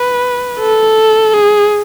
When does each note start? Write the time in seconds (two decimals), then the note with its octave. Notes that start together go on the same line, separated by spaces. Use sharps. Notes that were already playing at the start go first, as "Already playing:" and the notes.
Already playing: B4
0.60 A4
1.34 G#4